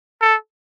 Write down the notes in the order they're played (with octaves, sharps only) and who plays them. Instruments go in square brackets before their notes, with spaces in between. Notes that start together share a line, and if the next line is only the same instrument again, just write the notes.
[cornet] A4